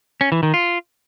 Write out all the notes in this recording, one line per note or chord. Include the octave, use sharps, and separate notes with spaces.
C#4
E3
D#3
F4